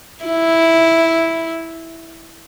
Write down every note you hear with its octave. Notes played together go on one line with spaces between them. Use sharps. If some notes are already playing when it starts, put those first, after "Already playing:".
E4